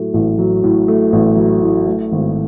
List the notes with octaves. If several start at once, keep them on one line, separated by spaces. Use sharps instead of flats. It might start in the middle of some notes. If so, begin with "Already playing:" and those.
Already playing: A2 F#3 A3
A1
F#3
A2
A3
A1
F#3
A2
A3
G#1